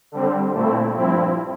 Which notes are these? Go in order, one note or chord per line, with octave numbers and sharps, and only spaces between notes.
D3 G3 C4
A#2 A3 C4 E4
G2 F3 C4 E4